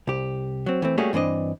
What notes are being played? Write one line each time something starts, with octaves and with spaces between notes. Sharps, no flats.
C2 G4
F#3 C4
E3 A3 C4
G3 A3 A#3 C#4 F#4 G#4
G2 E3 C4 D4 D#5